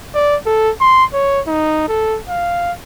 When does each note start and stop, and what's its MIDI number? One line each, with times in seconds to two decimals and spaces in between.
0.14 0.36 74
0.46 0.70 69
0.81 1.05 84
1.13 1.40 73
1.47 1.87 63
1.88 2.19 69
2.29 2.72 77